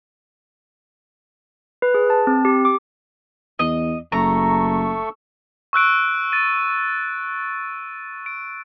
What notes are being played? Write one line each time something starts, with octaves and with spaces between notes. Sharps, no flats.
B4
G#4
A5
C4
G4
D6
E2 D#5
F#1 A3 A4 A#5 C#6
C#6 E6 F#6 D7
A6 D#7
D7